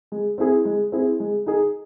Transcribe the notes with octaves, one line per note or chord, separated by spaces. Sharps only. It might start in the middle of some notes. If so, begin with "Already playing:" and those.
G#3
C4 E4 G#4
G#3
C4 E4 G#4
G#3
D#4 G#4